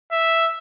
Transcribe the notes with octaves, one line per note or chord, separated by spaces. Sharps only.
E5